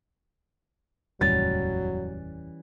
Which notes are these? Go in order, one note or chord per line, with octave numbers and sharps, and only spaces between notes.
F1 D#2 A2 E3 F#3 G3 C#4 A6